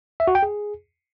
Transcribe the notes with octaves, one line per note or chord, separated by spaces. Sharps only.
E5
F#4
G5
G#4